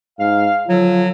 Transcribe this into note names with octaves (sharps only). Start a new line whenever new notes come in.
G#2 F5
D3 F3 F#3 F4